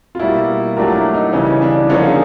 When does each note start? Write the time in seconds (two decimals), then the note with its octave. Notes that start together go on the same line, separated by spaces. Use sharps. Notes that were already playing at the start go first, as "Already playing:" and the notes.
0.15 F4
0.19 B2 G3 A#3 E4
0.76 F#3 A3 D4 F4 G4 A#4
0.95 E4
1.14 D#4
1.33 C#3 E3 G3 C#4
1.62 D4
1.89 D3 F3 A#3 C#4 D#4 G#4